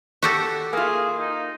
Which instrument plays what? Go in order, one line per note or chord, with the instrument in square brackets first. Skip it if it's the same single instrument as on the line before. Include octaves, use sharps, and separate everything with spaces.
[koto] F#4 G4 A4
[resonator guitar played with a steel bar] A#3 F4 [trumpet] G#4
[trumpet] D#4